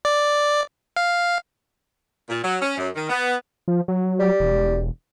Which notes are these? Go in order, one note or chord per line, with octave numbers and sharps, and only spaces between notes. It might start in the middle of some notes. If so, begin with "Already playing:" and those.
D5
F5
A#2
F#3
C#4
F#2
D#3
B3
F3
F#3
G3
E1